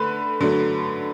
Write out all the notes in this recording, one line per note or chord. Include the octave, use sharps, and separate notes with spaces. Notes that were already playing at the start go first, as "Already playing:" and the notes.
Already playing: D3 A3 B4
D3 F#3 A3